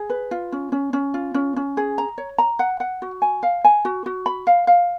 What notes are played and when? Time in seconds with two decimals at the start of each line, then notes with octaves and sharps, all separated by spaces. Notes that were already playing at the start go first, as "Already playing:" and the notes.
Already playing: G#4
0.10 B4
0.31 F4
0.52 C#4
0.72 C#4
0.93 C#4
1.14 F4
1.34 C#4
1.56 C#4
1.77 G#4
1.98 A#5
2.18 C#5
2.38 A#5
2.59 F#5
2.80 F#5
3.02 F#4
3.22 G#5
3.43 F5
3.65 G#5
3.85 F#4
4.06 F#4
4.26 B5
4.47 F5
4.67 F5